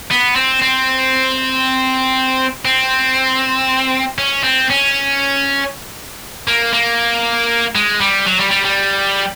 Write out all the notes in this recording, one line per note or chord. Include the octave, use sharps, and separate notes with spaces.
B3
C4
C4
C4
C#4
C4
C#4
A#3
A#3
G#3
G3
F#3
G3
G3
G3